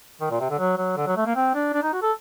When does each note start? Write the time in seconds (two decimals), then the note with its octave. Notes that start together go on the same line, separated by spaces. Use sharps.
0.21 D#3
0.31 A#2
0.40 C3
0.50 D3
0.59 F#3
0.78 F#3
0.97 D3
1.07 F#3
1.17 A3
1.26 A#3
1.36 C4
1.55 D4
1.74 D4
1.83 D#4
1.93 F#4
2.02 A4